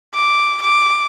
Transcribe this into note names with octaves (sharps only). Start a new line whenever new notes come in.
D6
D6